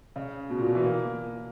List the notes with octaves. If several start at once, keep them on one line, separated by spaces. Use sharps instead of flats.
C#3
B2
A#2
B2
E3
A#3